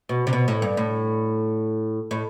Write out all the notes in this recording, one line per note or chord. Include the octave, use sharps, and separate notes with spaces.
B2
C3
B2
A2
G2
A2
A2